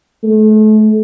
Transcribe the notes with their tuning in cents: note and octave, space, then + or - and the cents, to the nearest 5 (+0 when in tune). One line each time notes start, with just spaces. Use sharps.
A3 -35